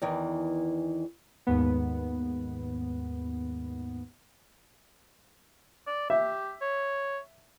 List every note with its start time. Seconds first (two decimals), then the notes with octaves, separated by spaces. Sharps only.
0.02 E2 D#3 E3
1.47 D#2 G#2 B3
5.87 D5
6.10 G4 E5
6.61 C#5